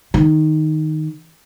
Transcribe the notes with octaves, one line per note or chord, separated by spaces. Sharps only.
D#3